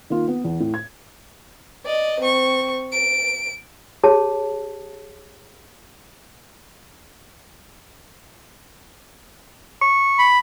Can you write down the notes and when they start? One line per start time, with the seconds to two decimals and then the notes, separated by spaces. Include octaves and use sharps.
0.10 D#3 A#3 F4
0.28 B3
0.45 E2
0.60 A2
0.74 G#6
1.86 D5 D#5
2.20 C4 C#6
2.92 D7
4.03 G4 G#4 C#5 A5
9.81 C#6
10.19 B5